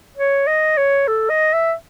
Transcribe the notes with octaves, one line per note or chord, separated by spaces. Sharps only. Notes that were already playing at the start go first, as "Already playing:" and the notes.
C#5
D#5
C#5
A4
D#5
E5